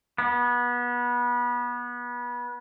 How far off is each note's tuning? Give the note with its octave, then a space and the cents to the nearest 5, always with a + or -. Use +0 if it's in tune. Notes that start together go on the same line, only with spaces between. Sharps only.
B3 -25